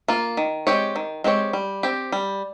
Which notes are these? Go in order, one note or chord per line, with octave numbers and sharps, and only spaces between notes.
A#3 F4
D#3
G#3 C4 G4 C#5
D#3
G#3 C4 G4 C#5
G3
C4 G4
G3